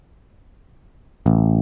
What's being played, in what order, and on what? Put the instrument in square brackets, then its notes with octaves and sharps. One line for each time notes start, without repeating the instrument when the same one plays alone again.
[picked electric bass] A1